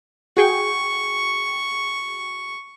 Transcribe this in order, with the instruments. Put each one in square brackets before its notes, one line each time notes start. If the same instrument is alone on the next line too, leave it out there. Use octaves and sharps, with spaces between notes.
[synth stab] F#4 G#4 G5 [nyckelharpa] C#6